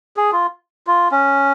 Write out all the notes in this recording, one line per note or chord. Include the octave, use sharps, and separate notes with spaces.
G#4
F4
F4
C#4